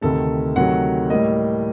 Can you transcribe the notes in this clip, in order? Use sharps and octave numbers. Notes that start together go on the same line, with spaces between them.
D2 C3 D#3 A3 A4
D2 C3 D#3 F#3 A3 F#5
A2 G3 A#3 D#5